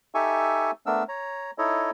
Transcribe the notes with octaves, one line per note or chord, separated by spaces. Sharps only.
D#4 G4 A4 E5 G#5 C#6
A3 B3 D4 A#4 E6
C#5 A#5
D#4 E4 A4 C#5 D#5